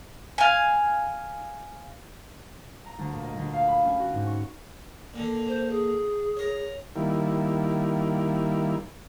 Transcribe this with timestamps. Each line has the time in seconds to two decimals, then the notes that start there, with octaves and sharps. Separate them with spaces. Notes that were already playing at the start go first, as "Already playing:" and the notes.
0.38 F5 G#5
2.86 A#5
2.98 D2
3.13 A#2
3.24 D#5
3.37 D2
3.53 F5
3.68 B5
3.84 C#4
4.00 F#4
4.12 G#2
4.27 C#6
5.14 A#2 D3
5.48 C5
5.70 G#4
6.37 A#4 C#5
6.96 D#3 G3 A#3 E4